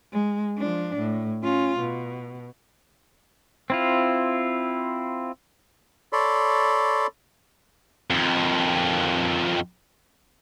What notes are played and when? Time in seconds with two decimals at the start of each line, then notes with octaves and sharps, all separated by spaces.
0.12 G#3
0.58 F3 D4
0.97 A2
1.43 C#4 F4
1.79 B2
3.70 C4 E4 F4
6.13 A4 C#5 D5 B5 C6
8.10 F2 D#3